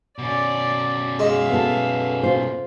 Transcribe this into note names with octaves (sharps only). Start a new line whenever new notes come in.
B2 C#4 D5
G#3 E5 F5
B3 A4
F4 C5